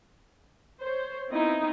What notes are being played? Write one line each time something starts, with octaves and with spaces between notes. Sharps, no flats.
C5 C#5
B3 C4 D#4 E4